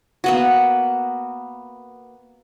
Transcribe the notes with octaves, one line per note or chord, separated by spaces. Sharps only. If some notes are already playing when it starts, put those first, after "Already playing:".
A#3 B3 F#4